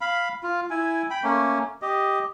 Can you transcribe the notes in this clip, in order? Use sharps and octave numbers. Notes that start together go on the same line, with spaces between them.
F5 B5
F4
E4 G#5
G5 B5
A3 A#3 C#4
G4 D#5